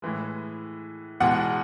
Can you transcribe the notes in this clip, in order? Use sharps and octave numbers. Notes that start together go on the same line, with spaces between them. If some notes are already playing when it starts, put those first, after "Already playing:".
A2 E3 G#3
E2 B2 G#3 F#5